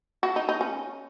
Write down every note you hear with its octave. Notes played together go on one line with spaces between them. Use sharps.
F#4
D#4
D#4
C#4